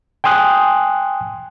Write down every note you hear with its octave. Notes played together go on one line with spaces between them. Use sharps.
G5 G#5 C6 D#6 F#6